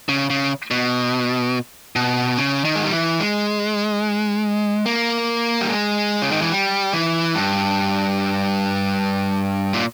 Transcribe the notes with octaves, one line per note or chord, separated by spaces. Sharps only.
C#3
C#3
B2
B2
C#3
D#3
G#3
G3
E3
G#3
A#3
G3
G#3
C#3
D#3
E3
G3
E3
G2
A#2